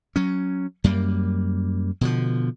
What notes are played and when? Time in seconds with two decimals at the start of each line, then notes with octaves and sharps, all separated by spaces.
0.16 F#3 C#4
0.84 F#2 G3 A#3
2.01 B2 D3 F3